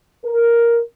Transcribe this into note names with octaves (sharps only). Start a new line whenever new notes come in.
A#4